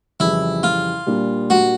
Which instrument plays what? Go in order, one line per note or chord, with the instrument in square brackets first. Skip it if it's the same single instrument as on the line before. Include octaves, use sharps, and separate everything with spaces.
[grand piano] F2 C#3 E3 G3 [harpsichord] E4
[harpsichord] F4
[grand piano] A#2 G3 A#3 D4
[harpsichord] F#4